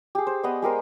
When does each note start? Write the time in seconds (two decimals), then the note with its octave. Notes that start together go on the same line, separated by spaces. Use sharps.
0.15 G4 G#4
0.27 C5
0.43 B3 D5 D#5
0.62 G#3 G4 A#4 C5